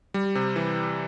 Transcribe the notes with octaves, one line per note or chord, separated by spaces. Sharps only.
G3
C3
E3